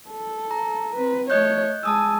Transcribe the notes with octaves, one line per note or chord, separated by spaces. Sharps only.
A4
A#5
C4 B4
A3 C#5 D#5 F#6 G6
G#3 G#5 A5 D#6 E6